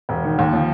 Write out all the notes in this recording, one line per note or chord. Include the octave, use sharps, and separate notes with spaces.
E1
D#3
D#2
F3